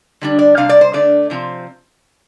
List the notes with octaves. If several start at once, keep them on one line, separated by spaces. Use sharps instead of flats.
D3 G3 D4
D5
C3 G3 D4 F5
D5
C5
D3 A3 D4 D5
C3 F3 C4